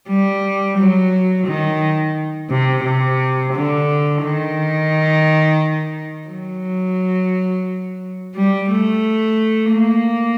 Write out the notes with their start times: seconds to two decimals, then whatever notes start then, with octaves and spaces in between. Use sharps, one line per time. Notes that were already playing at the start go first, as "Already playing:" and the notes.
0.09 G3
0.77 F#3
1.46 D#3
2.50 C3
2.83 C3
3.53 D3
4.22 D#3
6.28 F#3
8.35 G3
8.70 A3
9.72 A#3